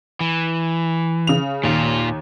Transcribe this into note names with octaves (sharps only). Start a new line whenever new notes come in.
E3
C#3 F7
D#2 A#2 F4